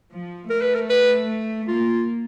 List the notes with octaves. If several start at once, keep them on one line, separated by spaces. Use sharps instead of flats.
F3
A3 A#4
B4
A#4
B4
A#3 F4